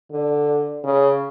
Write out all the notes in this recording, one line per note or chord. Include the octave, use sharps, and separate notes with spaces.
D3
C#3